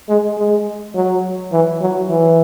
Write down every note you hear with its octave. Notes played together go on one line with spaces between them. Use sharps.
G#3
G#3
F#3
E3
F#3
E3